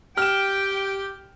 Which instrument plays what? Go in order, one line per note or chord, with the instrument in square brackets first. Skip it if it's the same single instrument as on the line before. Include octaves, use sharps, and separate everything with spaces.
[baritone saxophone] G4 [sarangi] G5 [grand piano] F6 E7